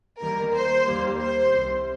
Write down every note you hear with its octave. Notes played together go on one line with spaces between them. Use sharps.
D#2 D#3 G3 A#3 A#4
C5
D#2 D#3 G3 A#3
C5
C2 C3 G3